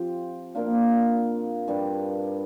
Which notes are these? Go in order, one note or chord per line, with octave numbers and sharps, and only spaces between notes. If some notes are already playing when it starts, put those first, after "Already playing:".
Already playing: F3 C4 G4
A#2 A#3 D4 F4
G2 G3 D4